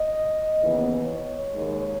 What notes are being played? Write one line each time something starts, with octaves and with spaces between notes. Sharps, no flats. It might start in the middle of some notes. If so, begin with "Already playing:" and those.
Already playing: D#5
D#2 C#3 E3 B3
C#5
D#2 D#3 G#3